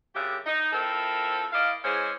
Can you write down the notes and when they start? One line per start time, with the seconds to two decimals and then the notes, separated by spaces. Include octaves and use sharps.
0.15 F#2 C#3 D4 G4 E5
0.46 D#4
0.73 F3 C4 E4 A4 A#4
1.53 E4 D5 D#5 F5
1.84 E3 G#3 C#4 G#4 C5